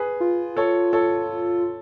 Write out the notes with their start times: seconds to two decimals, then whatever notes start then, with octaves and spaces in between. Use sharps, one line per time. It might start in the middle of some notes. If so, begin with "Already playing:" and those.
Already playing: G#4 B4
0.20 F4
0.57 A4 C#5
0.93 A4 C#5